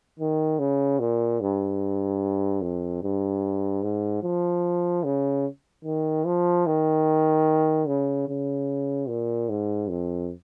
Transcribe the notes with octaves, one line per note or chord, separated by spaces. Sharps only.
D#3
C#3
A#2
G2
F2
G2
G#2
F3
C#3
D#3
F3
D#3
C#3
C#3
A#2
G#2
F2